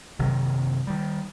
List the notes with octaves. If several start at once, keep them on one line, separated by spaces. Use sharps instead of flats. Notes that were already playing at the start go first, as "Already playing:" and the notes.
F#1 C3 D#3 F#3
D#3 G3